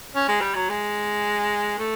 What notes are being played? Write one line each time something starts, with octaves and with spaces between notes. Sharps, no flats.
C#4
G#3
G3
F#3
G#3
A3